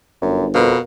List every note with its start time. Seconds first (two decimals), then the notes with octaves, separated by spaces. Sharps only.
0.22 G1 F#2
0.55 F2 B2 A#4 B4 F5